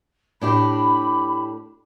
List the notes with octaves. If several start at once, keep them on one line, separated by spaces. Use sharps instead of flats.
A2 D4 G4 B5